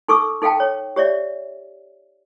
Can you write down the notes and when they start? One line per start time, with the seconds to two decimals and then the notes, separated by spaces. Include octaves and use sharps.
0.08 D#4 A4 C#6 D6 E6
0.42 D#4 A4 F5 G5 A5
0.60 C#5
0.96 G4 C#5 D5 E5